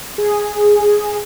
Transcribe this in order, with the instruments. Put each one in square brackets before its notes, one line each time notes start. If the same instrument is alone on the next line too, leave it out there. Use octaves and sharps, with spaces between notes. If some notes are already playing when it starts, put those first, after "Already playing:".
[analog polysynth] G#4